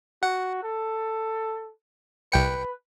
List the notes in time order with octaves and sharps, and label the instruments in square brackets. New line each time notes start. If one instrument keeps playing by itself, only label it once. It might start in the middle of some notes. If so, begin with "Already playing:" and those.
[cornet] F#4 [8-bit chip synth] F#5
[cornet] A4
[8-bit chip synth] C2 G5 C#7 [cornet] B4